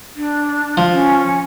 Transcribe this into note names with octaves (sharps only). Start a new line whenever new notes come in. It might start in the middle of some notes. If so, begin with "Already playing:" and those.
D4
F3
C#4